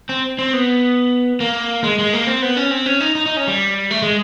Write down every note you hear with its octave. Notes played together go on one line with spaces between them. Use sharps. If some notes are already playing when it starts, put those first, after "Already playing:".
C4
C4
B3
A#3
G#3
G#3
A#3
C4
B3
C#4
C4
C#4
D#4
D#4
D#4
C#4
G3
A3
G#3